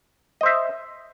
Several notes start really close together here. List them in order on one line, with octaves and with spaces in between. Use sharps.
D#5 C5 E5